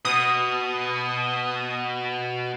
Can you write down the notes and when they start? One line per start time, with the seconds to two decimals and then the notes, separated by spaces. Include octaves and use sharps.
0.05 B2 D#6